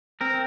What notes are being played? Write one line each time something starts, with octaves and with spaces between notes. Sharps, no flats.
C4 A#4